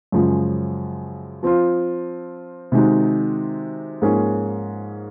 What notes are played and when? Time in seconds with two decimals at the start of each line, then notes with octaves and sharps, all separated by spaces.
0.12 F#2 C#3 F3 G#3
1.43 F3 C4 F4
2.72 C3 D#3 G#3 D#4 F#4
4.02 G#2 F3 A#3 C#4 G#4